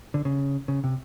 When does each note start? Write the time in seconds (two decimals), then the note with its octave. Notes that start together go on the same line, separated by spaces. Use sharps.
0.14 D3
0.25 C#3
0.68 C#3
0.84 C3